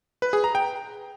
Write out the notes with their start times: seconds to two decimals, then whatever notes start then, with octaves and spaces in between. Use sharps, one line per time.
0.22 B4
0.33 G#4
0.44 A#5
0.55 G5